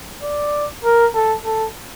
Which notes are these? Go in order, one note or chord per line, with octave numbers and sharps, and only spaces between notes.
D5
A#4
A4
A4